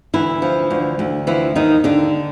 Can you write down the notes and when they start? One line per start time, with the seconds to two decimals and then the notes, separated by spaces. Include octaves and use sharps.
0.13 D2 E3 E4
0.42 F3
0.71 D2
0.99 D2
1.27 E3 F3 E4
1.55 D#2 D#3 D#4
1.84 D#2 D3 D4